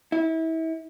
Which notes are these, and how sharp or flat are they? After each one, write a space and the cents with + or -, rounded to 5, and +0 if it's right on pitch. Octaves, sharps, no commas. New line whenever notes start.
E4 -30